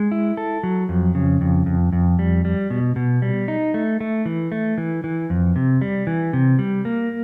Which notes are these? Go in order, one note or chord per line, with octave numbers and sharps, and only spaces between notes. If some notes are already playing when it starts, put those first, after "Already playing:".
Already playing: G#3
E4
A4
F#3
F2
C#3
F2
F2
F2
G3
G3
B2
B2
G3
D#4
A3
A3
E3
A3
E3
E3
F2
C3
G3
E3
C3
G3
A#3